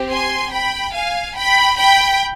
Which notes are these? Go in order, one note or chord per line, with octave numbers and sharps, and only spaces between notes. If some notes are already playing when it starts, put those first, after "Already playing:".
Already playing: C4 G4
G#5 C6
G5 B5
F5 G#5
G5 B5
G5 B5